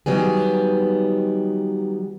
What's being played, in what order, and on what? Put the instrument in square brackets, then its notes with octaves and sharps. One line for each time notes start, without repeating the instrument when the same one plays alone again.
[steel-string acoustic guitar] D#3 F#3 G3 B3 G#4